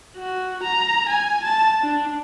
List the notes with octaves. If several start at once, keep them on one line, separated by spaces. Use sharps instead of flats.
F#4
A#5
G#5
A5
D4